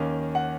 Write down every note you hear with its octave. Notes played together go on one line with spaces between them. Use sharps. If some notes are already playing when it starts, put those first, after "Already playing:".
Already playing: D#2 D#3 A#3 C#4
F#5